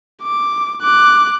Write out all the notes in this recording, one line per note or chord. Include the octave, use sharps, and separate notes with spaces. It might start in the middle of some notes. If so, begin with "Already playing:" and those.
D6
D6 F#6